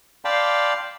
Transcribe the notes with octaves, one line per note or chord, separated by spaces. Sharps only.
D5 F5 G5 A5 B5 C6